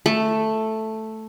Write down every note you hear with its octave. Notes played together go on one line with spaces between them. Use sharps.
A3